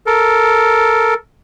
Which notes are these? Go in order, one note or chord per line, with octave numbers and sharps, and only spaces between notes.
A4 A#4